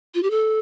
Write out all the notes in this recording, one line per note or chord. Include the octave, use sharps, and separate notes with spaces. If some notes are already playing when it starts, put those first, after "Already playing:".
F4
G4
A4